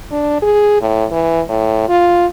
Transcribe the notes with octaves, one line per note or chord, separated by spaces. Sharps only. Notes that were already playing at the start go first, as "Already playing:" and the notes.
D4
G#4
A2
E3
A2
F4